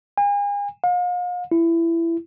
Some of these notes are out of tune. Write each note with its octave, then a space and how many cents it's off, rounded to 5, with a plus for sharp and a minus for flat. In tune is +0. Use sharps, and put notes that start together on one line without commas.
G#5 -40
F5 +40
E4 +20